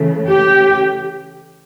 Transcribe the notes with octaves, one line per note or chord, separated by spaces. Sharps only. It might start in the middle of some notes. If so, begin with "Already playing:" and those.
Already playing: C#3 E3 A3
G4